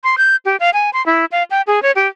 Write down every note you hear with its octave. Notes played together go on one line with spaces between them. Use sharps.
C6
G6
G4
F5
G#5
C6
E4
F5
G5
G#4
C#5
G4